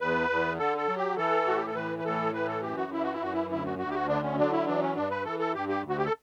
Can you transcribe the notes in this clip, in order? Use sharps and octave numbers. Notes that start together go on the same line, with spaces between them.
E2 B4
E2
D3 A4
A4
F#3
G4
E3 A4
A2 F#4
G4
A4
E3 B4
B4
A2 A4
E3 B4
A4
F#2 G4
F#4
E3 E4
F#4
E4
F#2 F#4
E4
D2 E4
F#4
D2 F#4
G4
F#4
D3 D4
C#4
F#3 D4
E4
E3 D4
C#4
G2 D4
B4
E3 A4
A4
G2 G4
G4
D2
F#4
G4
A4